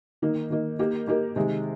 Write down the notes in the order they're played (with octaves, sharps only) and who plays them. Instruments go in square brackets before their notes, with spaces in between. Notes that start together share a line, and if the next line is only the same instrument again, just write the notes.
[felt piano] D#3 A#3 D#4
D#3 A#3 D#4
A#3 D#4 G4 A#4
A#3 D#4 G4 A#4
C3 D#3 G#3